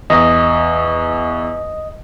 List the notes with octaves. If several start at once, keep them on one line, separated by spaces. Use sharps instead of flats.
E2 D#5